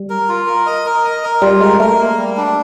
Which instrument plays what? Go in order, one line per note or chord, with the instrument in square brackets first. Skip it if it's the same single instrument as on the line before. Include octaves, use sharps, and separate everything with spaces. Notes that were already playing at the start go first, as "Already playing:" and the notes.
Already playing: [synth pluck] G3
[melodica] A#4
F4
A#4
D#5
A#4
D#5
A#4
[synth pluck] G3 [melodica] F4
[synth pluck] G#3 [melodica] A#4
[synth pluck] A3 [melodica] A#4
[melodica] A#3
G3
D4